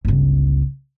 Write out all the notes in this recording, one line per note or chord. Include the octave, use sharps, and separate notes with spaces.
G1 C#2